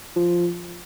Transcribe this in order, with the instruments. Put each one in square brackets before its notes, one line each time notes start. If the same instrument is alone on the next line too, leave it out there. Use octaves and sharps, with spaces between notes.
[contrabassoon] F3